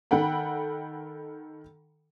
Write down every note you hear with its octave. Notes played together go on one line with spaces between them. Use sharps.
D#3 A4 F#5 G5 B5